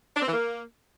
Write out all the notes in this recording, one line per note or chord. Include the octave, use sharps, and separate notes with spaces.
D4
C4
E3
A#3